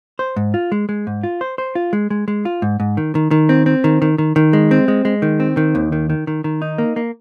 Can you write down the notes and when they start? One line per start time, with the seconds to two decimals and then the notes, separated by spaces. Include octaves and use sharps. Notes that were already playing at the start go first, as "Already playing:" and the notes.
0.19 C5
0.36 G#2
0.54 F4
0.72 G#3
0.89 G#3
1.07 G#2
1.23 F4
1.41 C5
1.58 C5
1.75 F4
1.93 G#3
2.10 G#3
2.28 G#3
2.45 F4
2.62 G#2
2.80 G#2
2.97 D#3
3.15 D#3
3.31 D#3
3.49 C4
3.66 C4
3.84 D#3
4.02 D#3
4.18 D#3
4.36 D#3
4.53 G#3
4.71 C4
4.88 G#3
5.05 G#3
5.22 D#3
5.40 C4
5.57 D#3
5.75 D#2
5.92 D#3
6.10 D#3
6.27 D#3
6.44 D#3
6.62 D#4
6.78 A#3
6.96 A#3